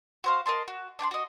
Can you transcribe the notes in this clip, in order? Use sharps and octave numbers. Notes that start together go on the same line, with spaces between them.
F#4 C5 F5
A#4 D#5 A5 C6
F#4
D4 D5 G5 C6
F#4 D#5